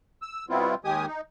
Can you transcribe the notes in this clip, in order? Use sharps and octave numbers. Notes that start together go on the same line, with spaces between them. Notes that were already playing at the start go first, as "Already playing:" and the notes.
E6
B2 G3 B3 C4 E4 F4
D#2 D#3 G#3 G4 G#5 D#6
D#4